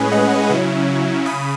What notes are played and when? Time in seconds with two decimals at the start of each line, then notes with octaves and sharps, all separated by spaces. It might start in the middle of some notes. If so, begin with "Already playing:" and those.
Already playing: A2 G#3 C#4 G#4 B4
0.12 D#5 F#5
0.50 C#3 F#3 C#4 E4
1.25 C#3 B5 D#6